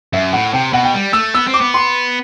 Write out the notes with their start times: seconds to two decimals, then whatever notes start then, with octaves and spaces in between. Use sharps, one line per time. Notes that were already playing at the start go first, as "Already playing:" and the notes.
0.13 F#2 E5
0.33 A2 F#5
0.53 C3 G5
0.73 B2 F#5
0.83 G5
0.94 G3
1.13 A3 E6
1.34 B3 E6
1.47 C4
1.54 D6
1.61 B3
1.74 C6